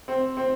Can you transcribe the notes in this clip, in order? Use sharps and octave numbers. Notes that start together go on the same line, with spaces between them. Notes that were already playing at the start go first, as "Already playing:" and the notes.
C4
C4